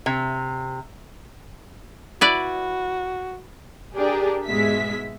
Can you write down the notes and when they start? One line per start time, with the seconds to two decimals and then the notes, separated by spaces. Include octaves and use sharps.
0.06 C3
2.21 E4 F#4 B4 D5
3.96 D4 G4 G#4 A#4
4.47 G#2 B2 G#3 E5 B6